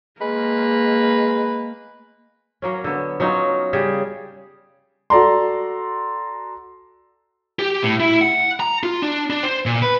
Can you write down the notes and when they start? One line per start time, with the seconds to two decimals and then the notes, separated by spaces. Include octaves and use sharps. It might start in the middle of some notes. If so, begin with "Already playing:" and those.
0.21 G#3 A#3 B4
2.62 F#3 A#3 C#4
2.84 D3 B3
3.20 F#3 C#4 D#4 F4
3.73 C#3 G3 G#4
5.10 F#4 A4 D5 A#5 C6
7.59 G4
7.83 A2
8.00 E4
8.21 F#5
8.60 A#5
8.83 F4
9.02 D4
9.30 D4
9.43 C5
9.66 A#2
9.82 B4